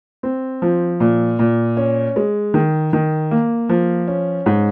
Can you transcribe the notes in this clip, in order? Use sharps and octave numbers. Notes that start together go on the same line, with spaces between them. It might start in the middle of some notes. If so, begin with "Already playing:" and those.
C4
F3
A#2
A#2
C#4
G#3
D#3
D#3
A#3
F3
C#4
G#2